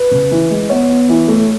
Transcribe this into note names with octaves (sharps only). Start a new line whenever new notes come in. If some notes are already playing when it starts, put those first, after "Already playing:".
Already playing: B4
C#3
E3
G#3
B3 C#5
B3
E3
A3